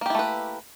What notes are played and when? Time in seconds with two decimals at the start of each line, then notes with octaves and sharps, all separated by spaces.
0.01 A#3
0.06 G4
0.10 E4
0.15 A3
0.19 B4